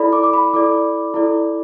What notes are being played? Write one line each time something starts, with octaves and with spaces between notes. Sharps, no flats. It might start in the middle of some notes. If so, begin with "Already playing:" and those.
Already playing: E4 A4 D5 B5
D6
D6
B5
E4 A4 D5 D6
E4 A4 D5